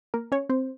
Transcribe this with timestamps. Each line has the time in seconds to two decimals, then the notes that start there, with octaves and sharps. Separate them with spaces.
0.14 A#3 A#4
0.32 C#4 C#5
0.49 C4 C5